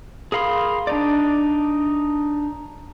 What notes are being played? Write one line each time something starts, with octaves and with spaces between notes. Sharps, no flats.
G#4 A#4 F5 B5 C6
D4 D#4 D5